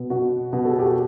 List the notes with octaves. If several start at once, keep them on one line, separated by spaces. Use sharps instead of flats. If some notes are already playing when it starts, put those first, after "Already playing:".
Already playing: B2 B3
B2 F#4
B2
A4
G#4
G4
F#4